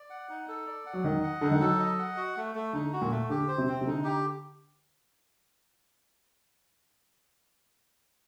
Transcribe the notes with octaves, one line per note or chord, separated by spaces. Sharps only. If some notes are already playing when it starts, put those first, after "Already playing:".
Already playing: D5
F#5
D#4
A4
D5
F#5
F#3
D#3 D#5
F#5
D3 D#4
D#3
F#3 A4
D#5
F#5
F#4
A3
A3
D3 D#4
F#4
A#2
A3
D3 G4
C5
C3
C4
C3
D3 D#4
G4